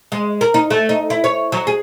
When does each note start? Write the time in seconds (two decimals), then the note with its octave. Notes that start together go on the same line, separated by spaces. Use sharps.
0.12 G#3
0.41 A#4
0.54 D#4
0.70 A3
0.89 D#4
1.10 E4
1.24 C#5
1.52 F#3
1.67 G#4